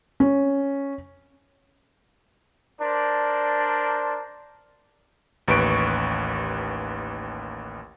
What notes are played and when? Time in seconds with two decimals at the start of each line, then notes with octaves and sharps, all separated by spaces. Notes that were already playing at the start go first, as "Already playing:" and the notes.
0.20 C#4
2.81 D4 A#4 C5 D5 A5
5.48 A1 D#2 B4 C#6 D7